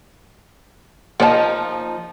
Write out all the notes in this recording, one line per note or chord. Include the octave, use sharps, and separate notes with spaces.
F3 A#3 D#4 C#5 A5